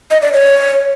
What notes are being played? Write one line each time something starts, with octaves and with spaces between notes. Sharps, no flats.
D#5
D5
C#5